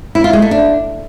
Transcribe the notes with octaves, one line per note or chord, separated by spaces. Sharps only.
E4
F4
G#3
A3
D4